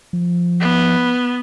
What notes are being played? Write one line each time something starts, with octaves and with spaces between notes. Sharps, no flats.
F3
B3